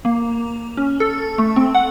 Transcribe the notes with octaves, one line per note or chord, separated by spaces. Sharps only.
A#3
C#4
A4
A3
C4
F#5